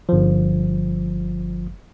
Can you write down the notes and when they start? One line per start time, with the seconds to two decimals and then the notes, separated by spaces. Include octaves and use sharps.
0.09 G1 F3